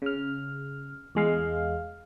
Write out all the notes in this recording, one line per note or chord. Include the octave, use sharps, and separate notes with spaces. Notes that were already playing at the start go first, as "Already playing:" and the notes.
C#3 F6
E2 G#3 F5